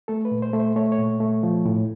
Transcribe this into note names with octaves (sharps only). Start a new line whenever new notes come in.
A3 A4
B4
A#2
C5
A3
C5
A3 C#5
C#5
A#2
A3
F3
A2